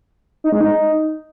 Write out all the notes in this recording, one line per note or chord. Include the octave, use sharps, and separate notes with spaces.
D#4
G#3
D#4